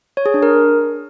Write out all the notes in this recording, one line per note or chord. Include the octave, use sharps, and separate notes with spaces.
C#5
G#4
D4
A#4